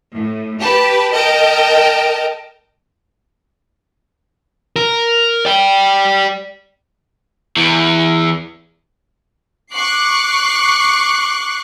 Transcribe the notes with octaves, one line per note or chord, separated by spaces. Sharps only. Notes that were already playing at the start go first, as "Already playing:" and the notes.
A2
G4 B4 A5
A#4 D#5 G5 A5
A#4
D5 G5
E2 E3
C#6 D6 F#6 C7